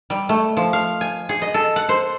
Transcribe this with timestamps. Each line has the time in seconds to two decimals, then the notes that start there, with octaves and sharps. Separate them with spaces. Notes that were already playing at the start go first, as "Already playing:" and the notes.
0.10 G3
0.29 A3
0.57 F3
0.73 F5
1.01 G#5
1.29 G#4
1.42 D#5
1.54 A4
1.76 F#5
1.89 C5